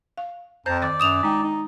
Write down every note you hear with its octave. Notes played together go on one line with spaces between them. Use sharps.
F5
F2 C5 A5 A#5 G6
D#3 D5 A6
F#2 D#6 E7 F7
G#3 D#4 G5
D#4